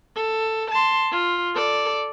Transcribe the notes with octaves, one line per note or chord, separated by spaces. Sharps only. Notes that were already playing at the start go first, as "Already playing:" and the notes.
A4
A5 C6
F4
A4 D5